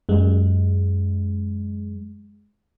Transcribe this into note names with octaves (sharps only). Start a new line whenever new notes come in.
F#2 G#3